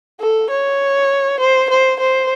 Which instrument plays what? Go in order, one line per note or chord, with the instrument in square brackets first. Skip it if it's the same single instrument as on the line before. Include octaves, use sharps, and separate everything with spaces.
[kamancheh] A4
C#5
C5
C5
C5